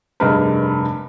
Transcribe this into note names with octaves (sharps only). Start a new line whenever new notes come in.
F1 G2 G#3 A#4 B4